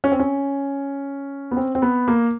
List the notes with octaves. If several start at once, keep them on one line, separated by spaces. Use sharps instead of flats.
C#4
C4
C#4
B3
C4
C4
B3
A#3